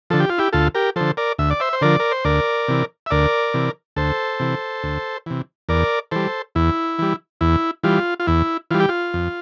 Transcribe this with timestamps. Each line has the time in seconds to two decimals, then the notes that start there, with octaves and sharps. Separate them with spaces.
0.10 D3 F3 A4
0.20 G4
0.30 F4
0.38 E4 G4
0.53 D2 F4 A4
0.75 G4 A#4
0.96 D3 F3 A4 C5
1.17 A#4 D5
1.38 D2 E5
1.51 D5
1.60 C5 E5
1.73 C5
1.81 D3 F3 A#4 D5
2.00 A#4
2.12 C5
2.25 D2 A#4 D5
2.68 C3 E3
3.06 E5
3.10 D2 A#4 D5
3.54 C3 E3
3.96 D2 A4 C5
4.40 C3 E3
4.83 D2
5.26 C3 E3
5.69 E2 A#4 D5
6.11 E3 G3 A4 C5
6.55 E2 E4
6.99 E3 G3
7.41 E2 E4
7.83 E3 G3 F4
8.20 F4
8.27 E2 E4
8.71 E3 G3 F4
8.80 G4
8.89 F4
9.14 F2